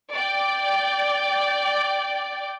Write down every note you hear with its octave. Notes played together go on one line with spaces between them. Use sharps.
D5 G5